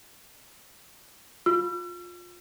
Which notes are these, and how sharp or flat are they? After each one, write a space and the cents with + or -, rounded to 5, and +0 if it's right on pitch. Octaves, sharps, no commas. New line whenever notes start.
F4 +20 E6 +45